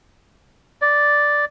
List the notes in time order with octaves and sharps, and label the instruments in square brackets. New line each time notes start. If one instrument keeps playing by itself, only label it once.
[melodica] D5